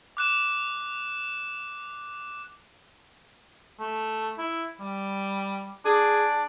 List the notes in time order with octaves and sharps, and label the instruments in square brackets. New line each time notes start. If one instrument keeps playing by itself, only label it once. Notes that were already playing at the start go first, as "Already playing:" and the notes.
[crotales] D6 F#6 E7
[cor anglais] A3
E4
G3
[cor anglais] D4 [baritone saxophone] G#4